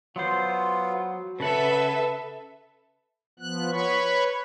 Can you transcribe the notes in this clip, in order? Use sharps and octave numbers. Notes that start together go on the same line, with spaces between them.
F#3 B3 F4 C5
C#3 A4 B4 E5 F#5 A5
F3 B3 F#6
B4 C#5 B5 C#6